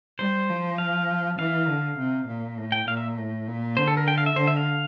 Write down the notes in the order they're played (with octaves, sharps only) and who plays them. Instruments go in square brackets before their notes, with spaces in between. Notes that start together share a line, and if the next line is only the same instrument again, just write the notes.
[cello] G3 [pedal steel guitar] C5
[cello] F3
[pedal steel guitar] F5
[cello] E3 [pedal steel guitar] F5
[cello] D3
C3
A#2
A2
[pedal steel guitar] G5
[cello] A#2 [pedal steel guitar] F5
[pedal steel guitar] E5
[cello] A2
A#2
[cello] D3 [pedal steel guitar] C5
[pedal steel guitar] A4
A#4
G5
F5
E5
[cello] D3 [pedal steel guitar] C5
[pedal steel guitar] E5
F5